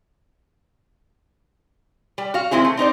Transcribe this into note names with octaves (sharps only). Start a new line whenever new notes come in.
G3
F#4 F5
D#3 G#3 C4 E4 G#4
A3
C4 D#4 C5 D5